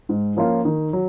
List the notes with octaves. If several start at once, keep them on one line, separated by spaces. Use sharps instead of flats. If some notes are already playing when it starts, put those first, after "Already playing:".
G#2
F3 A#3 C#4 F4
D#3
F#3